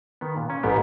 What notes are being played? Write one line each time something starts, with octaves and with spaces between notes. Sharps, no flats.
D#3 B3
A#2
C#4
A1 G#2 B3 G4